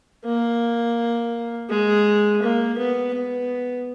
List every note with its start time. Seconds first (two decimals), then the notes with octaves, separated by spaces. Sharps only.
0.25 A#3
1.70 G#3
2.42 A#3
2.78 B3
3.14 B3